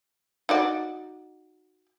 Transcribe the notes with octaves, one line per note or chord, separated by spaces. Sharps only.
D#4 F#4 D5